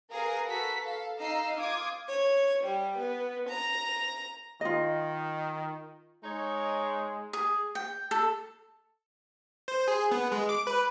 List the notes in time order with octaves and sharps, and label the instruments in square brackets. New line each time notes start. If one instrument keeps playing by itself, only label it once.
[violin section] G#4 A#4 B4 F5 A#5 D#6
F#4 A4 B4 A#5 B6
A4 F5
D#4 D#5 F5 A#5 E6 C7
F4 D6 D#6 G#6
[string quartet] C#5
G3
B3
A#5
[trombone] D#3 [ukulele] F4 D#5
[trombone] G#3 [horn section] D#4 C#5
[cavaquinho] G#4
G5
A4
[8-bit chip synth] C5
G#4
B3
G#3
D6
B4